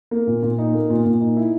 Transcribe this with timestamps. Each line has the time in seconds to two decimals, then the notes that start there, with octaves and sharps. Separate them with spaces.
0.11 A#3
0.27 A#2
0.43 A#2
0.59 D#4
0.74 A#3
0.90 A#2
1.05 A#2
1.21 D#4
1.37 E4